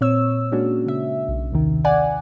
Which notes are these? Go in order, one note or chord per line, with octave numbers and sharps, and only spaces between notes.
A#2 C4 C#5 E6
G#3 A#3 C#4 D4 F#4
C#3 E5
B1
D#2 C3 D#3
D5 F#5 G#5